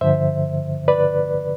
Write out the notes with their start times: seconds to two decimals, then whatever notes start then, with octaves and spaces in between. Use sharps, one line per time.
0.01 G2 D3 F3 C5 E5
0.88 B4 D5